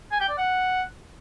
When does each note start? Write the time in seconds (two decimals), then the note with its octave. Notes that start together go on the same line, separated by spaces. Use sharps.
0.12 G#5
0.21 G5
0.29 D5
0.38 F#5